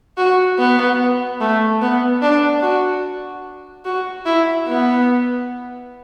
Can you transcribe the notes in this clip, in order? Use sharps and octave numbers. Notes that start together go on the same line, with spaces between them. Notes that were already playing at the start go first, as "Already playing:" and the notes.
F#4
B3
A3
B3
D4
F#4
F#4
E4
B3